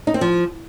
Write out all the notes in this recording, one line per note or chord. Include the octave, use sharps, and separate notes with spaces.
D#4
C4
F3